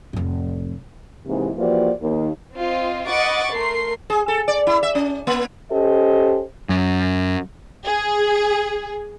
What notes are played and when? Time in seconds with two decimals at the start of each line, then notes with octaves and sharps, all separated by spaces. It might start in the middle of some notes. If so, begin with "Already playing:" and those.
0.13 F1 A2
1.27 D#2 G#2 C3 E3
1.57 E3 F3 A#3 F#4 G4 D5
2.01 D#2
2.54 C4 F4 D#5
3.07 D#5 F#5 B5 C#6 D6 A6
3.53 A3 A#4 C6 C7
4.10 G#4
4.28 A4
4.48 D5
4.67 E4
4.83 E5
4.95 C#4
5.27 A#3
5.71 C#4 G4 A4 C5 D#5
6.69 F#2
7.86 G#4